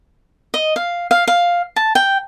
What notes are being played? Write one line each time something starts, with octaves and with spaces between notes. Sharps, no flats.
D#5
F5
F5
F5
A5
G5